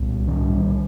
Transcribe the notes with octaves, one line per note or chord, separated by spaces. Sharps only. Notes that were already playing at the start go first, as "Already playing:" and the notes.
Already playing: C2 A#2
D#3 G3